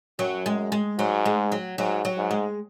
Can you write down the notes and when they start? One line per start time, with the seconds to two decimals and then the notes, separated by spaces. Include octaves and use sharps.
0.19 F#2 F#3
0.46 G#3
0.72 G#3
0.99 G#2 F#3
1.26 G#3
1.52 F#3
1.78 G#2 F#3
2.05 F#3
2.18 G#2
2.31 G#3